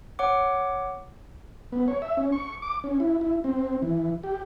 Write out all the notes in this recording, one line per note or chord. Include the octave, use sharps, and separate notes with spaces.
C#5 F#5 D6
B3
C#5
E5
C#4
C#6
D6
C#4
E4
E4
C4
E3
G4